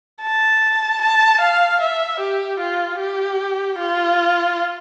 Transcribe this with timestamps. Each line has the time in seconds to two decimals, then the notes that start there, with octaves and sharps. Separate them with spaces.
0.22 A5
1.01 A5
1.41 F5
1.81 E5
2.20 G4
2.60 F4
2.99 G4
3.78 F4